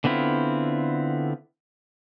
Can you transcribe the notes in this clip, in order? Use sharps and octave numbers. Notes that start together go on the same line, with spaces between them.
D3 B3 C4 E4 F4